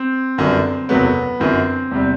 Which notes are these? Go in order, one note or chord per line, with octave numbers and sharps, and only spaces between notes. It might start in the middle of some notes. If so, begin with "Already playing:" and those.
Already playing: C4
G1 F#2 D3 G3
F#1 E2 C3 F#3 A3 B3
G1 F#2 E3 C4
E2 C3 G3